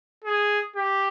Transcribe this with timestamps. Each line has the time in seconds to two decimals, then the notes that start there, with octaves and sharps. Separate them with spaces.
0.24 G#4
0.76 G4